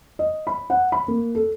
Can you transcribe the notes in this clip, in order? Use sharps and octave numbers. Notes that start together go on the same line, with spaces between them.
D#5
B5
F#5
B5
A#3
A4